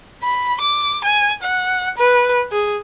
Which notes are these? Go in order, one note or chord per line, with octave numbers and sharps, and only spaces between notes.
B5
D6
G#5
F#5
B4
G#4